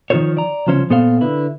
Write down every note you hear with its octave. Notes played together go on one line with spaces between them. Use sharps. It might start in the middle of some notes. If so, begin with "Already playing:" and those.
D#3 F3 F4 A4 C5 C#5
D5 A#5
C2 C#3 F3 C#4 C5 C#5
A#2 B3 A4 C5 D#5 F5
D3 E4 B4